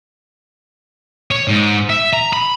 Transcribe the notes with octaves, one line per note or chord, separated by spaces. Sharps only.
C#5
G#2
E5
A#5
B5